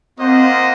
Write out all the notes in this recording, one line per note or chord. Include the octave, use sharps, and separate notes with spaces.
A#3 C4 F4 C5 D#5 F#5